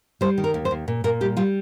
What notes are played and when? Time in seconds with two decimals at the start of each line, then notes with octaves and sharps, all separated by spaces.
0.21 G3 C5
0.38 D#3
0.44 A#4
0.54 D#2
0.65 C5
0.71 D#2
0.88 A#2
1.04 A#2 A#4
1.21 G3 G4
1.37 G3 F4